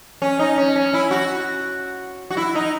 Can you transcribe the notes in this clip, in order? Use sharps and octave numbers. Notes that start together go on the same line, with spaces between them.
C#4
D#4
C#4
C#4
E4
F#4
F#4
E4
D#4